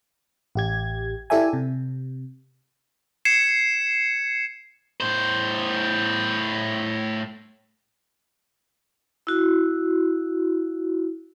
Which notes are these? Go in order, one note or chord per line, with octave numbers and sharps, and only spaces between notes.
A1 G4 G#6
E4 G4 A4 D5 E5 G#5
C3
G#6 C7 C#7 E7
A2 C5
E4 F#4